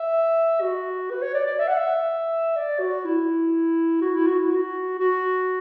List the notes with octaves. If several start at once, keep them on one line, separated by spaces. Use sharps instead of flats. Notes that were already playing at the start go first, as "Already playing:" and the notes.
Already playing: E5
F#4
B4
C#5
D5
D5
E5
F#5
E5
D5
F#4
E4
F#4
E4
F#4
E4
F#4
F#4